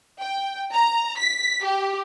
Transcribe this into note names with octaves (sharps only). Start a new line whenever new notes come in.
G5
A#5
B6
G4